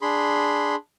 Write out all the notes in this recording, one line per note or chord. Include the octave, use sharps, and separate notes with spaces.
D4 G#4 B5 C6